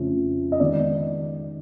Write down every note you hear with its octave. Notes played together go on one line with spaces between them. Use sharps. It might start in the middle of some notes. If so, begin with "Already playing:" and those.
Already playing: F2 C#3 F3 A3 C#4
D#5
D#3 G#3 B3 D#4 D5